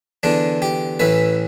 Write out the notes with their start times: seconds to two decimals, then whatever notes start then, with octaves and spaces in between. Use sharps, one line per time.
0.23 E2 D3 D4
0.62 G4
1.00 A1 A2 E3 B4